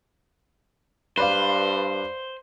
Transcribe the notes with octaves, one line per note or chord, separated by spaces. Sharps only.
G2 B4 C5 D5 F5